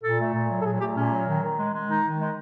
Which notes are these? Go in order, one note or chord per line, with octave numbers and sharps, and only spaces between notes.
A#2 A4
A3
A#2
F#3
A4
A#2 G#4
A3 G4
A#2 C#4
F#3
D#3
D#3
G#3
G#3
D#3 D#4
D#3
G#3